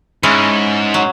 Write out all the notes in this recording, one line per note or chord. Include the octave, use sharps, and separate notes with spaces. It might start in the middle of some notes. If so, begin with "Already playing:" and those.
G#2 G#3 C#4 E4
F#3